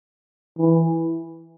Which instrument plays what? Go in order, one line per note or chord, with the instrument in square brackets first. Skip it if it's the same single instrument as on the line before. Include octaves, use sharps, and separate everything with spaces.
[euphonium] E3